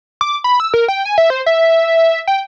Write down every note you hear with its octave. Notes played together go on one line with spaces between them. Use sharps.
D6
B5
E6
A#4
G5
G#5
E5
C5
E5
G5